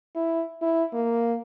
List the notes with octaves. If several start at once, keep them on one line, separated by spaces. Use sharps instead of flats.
E4
E4
A#3